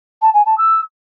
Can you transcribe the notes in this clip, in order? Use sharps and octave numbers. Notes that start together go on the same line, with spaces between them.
A5
G#5
A5
E6